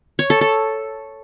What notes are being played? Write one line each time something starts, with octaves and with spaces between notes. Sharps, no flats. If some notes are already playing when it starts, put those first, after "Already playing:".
C#5
A4
A4